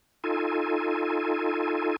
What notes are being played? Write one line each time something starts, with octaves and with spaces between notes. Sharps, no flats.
D#4 F4 A4 G#5